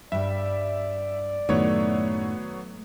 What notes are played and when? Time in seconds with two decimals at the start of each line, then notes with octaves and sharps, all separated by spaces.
0.12 G2 G3 D5 E5
1.49 F#2 A2 D#3 F#3 A3 B3 C#5